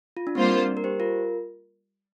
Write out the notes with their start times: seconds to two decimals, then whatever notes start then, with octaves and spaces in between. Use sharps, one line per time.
0.17 F4
0.27 D4
0.35 G3 A#3 C4 F4 C5
0.52 D4
0.77 A#4
0.84 G4 C5
1.00 F4 A#4